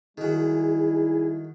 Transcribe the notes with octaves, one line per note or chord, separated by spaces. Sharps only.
D#3 F#3 G3 D#4 E4 G#4